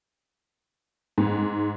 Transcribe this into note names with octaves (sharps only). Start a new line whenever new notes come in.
G#2